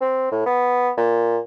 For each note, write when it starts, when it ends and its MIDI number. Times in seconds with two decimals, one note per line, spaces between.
0.01 0.30 60
0.32 0.45 45
0.46 0.89 59
0.97 1.38 46